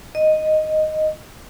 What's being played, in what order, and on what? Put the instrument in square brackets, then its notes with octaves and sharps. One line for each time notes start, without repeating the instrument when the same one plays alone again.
[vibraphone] D#5